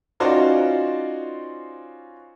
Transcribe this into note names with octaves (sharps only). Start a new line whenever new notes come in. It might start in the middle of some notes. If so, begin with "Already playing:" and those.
C#4 D#4 F4 F#4 C5 D5